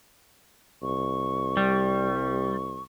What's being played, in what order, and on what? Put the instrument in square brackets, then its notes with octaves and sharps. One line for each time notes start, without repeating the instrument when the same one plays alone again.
[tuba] C2 [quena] C#6
[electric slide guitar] G3